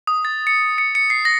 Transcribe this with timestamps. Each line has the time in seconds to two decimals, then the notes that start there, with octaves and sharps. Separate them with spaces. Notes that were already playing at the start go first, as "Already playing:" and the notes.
0.07 D#6
0.25 A6
0.47 C#7
0.78 C#7
0.95 C#7
1.10 C7
1.25 A#6